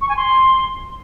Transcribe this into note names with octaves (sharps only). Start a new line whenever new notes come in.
C#6
G#5
C6